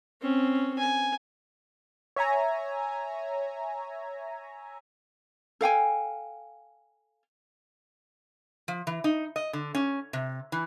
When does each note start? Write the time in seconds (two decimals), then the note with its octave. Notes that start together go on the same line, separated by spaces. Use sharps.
0.21 C4 C#4
0.79 G#5
2.16 C#5 E5 G#5 A#5
5.61 A4 F5 G5 G#5
8.68 F3
8.87 E3
9.04 D#4
9.36 D#5
9.53 D3
9.75 C#4
10.13 C3
10.52 E3